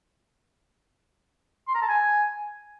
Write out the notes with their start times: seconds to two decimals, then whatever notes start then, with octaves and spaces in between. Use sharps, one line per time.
1.68 C6
1.75 A#5
1.82 A5
1.89 G#5